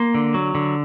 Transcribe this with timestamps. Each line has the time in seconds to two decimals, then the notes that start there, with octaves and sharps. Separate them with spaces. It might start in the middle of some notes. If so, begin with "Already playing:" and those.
Already playing: A#3 C6
0.14 D3
0.34 F#3
0.55 D3